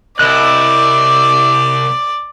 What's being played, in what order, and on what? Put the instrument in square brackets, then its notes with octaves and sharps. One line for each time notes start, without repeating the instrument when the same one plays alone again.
[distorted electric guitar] C2 [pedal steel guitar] E4 D#5 F#6 [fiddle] D5